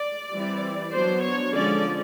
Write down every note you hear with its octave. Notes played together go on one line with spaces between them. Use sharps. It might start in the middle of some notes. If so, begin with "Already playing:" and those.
Already playing: D5
E3 G3 C4
F#3 B3 D4 C5
C#5
D3 F3 G#3 C#4 D5